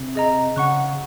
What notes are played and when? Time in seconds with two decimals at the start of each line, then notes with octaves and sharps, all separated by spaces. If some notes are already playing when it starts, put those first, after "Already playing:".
Already playing: C3
0.15 G#4 D#5 A#5
0.56 C#3 F#5 C#6 F#6